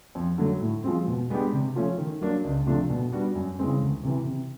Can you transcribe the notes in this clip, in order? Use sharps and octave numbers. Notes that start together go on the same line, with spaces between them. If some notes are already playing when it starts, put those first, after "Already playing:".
F2
D3 F#3 A3
A2
F3 G#3 C4
B2
G#3 B3 D4 G4
C3
F3 A3 C#4
D#3
F#3 A#3 D4
C#2
C3 F3 A3 D4
B2
G3 B3 D4 F#4
F#2
C#3 E3 G#3 C4
D2
C3 E3
C3